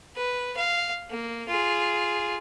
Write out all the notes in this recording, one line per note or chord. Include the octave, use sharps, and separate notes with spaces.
B4
F5
A#3
F4 G#4